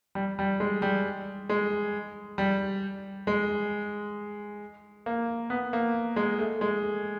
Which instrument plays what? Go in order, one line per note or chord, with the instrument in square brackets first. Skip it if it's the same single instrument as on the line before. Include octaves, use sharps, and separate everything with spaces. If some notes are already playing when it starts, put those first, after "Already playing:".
[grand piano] G3
G3
G#3
G3
G#3
G3
G#3
A#3
B3
A#3
G#3
A3
G#3